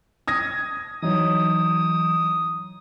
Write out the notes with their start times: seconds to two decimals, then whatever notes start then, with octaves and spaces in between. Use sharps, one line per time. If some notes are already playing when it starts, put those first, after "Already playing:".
0.28 D#6 G#6 A#6
1.03 E3 F#3 D#4 C#5 D#6